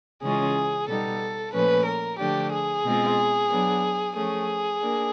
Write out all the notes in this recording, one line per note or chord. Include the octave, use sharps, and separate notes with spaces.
C#3 E3 G#3 C#4 F4 G#4
B2 G3 B3 D#4 A4
A#2 F3 A3 C#4 B4
A#4
D3 F3 A3 D4 G4
G#4
B2 G#3 C4 F4
F#3 B3 D4
F3 A3 C#4 G#4
A#3 D4